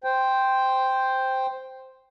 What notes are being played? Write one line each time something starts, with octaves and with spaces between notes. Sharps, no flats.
C5 G5